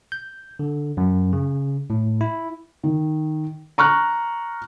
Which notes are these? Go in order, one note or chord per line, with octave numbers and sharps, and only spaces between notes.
G6
D3
F#2
C#3
A2
E4
D#3
A#5 C#6 F6 F#6